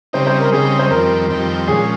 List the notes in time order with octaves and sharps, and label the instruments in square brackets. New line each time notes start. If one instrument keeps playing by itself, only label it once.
[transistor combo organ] C#3 G3 C4 D#4 [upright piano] C5
[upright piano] C5
A#4
[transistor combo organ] C#3 G3 C4 D#4 [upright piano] G#4
[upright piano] C5
[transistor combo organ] F2 D#3 G3 C4 [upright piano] A#4
[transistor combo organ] F2 D#3 G3 C4
[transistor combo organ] A#2 F3 G#3 C#4 [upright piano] G#4